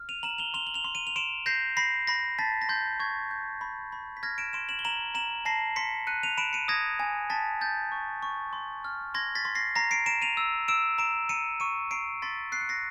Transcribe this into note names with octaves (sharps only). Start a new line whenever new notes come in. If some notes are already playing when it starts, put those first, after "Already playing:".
Already playing: F6
D#7 F7
A#5 E7 F#7
F7 G7
C6 F7 G7
F#7
F7 G7
C6
D#7 F7
F7
C6 D7 E7
G6 A#6 C7
B5 A#6 C7
B5 A#6 C7
A5 A6 B6
A#6
C6 G6 A6
C#6 G#6
G6
B5
B5
B6
F6 G#6 A#6
D7 E7
C6 D7 E7
E7 F#7
G7
A#5 E7 F#7
A#5 E7 F#7
A5 A#6 C7
C6 B6 C#7
F#6 C#7 D#7
D#7 F7
B5 D7 E7
C#7 D#7
D#6 G#6 A#6
G#5
A5 A6 B6
G6 A6
C#6
C#6
C6
F6
C6 G#6 A#6
A6 B6
C6
A#6 C7
A#5 A#6 C7
C7 D7
A#5 D7 E7
D#7 F7
E6
E6 D7 E7
A#5 D7 E7
A#5 C#7 D#7
C#6 C#7 D#7
A#5 C7 D7
C6 A6 B6
F#6 C7
C#7
A#6 C7